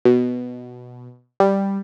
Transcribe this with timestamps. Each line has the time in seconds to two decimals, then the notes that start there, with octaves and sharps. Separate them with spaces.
0.05 B2
1.40 G3